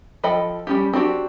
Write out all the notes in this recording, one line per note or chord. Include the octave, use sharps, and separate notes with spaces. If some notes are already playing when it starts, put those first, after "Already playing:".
F3 A4 D#5 G5 B5
G3 C#4 G4
C4 D4 F#4 G4